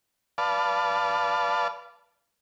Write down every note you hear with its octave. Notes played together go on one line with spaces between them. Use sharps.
B4 D5 F5 A5